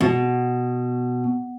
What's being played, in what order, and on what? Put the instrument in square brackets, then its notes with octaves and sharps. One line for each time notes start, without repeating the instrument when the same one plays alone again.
[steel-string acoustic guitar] B2